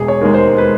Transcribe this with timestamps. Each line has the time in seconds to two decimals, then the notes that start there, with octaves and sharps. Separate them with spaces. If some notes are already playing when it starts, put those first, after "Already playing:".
Already playing: E1 G#4
0.08 C#5
0.21 D#2 D#3 G#3
0.34 C5
0.58 B4